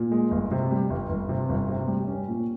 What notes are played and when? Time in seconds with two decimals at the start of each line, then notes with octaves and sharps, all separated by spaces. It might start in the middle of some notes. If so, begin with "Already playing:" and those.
Already playing: A#2
0.11 G#3
0.31 G1
0.51 C3
0.71 G3
0.90 G1
1.09 G1
1.29 C3
1.49 G1
1.68 C3
1.87 G3
2.08 C#4
2.27 A#2